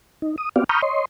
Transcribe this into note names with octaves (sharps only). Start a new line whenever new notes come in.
D#4
D#6
B3 C4 F#4 G4 D5 F5
A#5 B5 C#6 D#6 F6 G6
C#5 D#5 C6